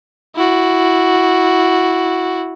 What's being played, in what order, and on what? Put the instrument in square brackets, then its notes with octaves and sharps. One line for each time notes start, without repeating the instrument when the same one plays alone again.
[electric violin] E4 F#4